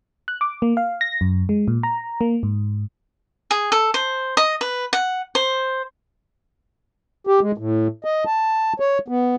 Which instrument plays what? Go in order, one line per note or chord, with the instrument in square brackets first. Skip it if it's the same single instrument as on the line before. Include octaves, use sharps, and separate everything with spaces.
[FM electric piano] F#6
D6
A#3
F5
A#6
F#2
G#3
A#2
A#5
A#3
G#2
[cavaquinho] G#4
A4
C5
D#5
B4
F#5
C5
[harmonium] G4
G#3
A2
D#5
A5
C#5
B3